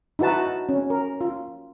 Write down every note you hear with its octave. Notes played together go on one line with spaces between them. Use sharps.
D#4 E4 F#4 B4 A5
C#4
A#4
F4